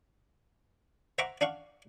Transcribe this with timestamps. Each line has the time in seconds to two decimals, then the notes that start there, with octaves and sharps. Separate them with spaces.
1.18 C5 E5 F#5 A#5 C#6 D6
1.41 D4 F5 F#5 C#6